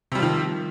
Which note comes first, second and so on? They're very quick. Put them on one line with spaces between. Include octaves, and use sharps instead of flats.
C3 G3 F3 D#3